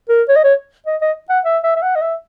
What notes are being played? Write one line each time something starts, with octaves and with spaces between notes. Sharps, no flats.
A#4
C#5
D#5
C#5
D#5
D#5
F#5
E5
E5
E5
F#5
D#5
E5